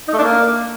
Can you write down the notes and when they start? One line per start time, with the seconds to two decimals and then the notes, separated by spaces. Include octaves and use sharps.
0.08 D#4
0.13 A3
0.18 D4
0.23 A#3